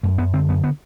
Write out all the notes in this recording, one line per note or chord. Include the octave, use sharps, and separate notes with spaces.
F#2 A3
F#2 B3
D3 C4
F#2 B3
B3